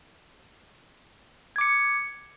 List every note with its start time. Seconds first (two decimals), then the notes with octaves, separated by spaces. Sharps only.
1.56 G#6
1.58 D6
1.61 C#7